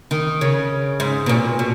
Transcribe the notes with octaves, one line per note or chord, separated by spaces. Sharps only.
D#3
C#3
G#2
B2
A#2
B2